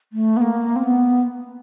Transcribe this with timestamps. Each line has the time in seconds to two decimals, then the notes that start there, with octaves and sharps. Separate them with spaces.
0.13 A3
0.37 B3
0.41 A#3
0.76 C4
0.83 B3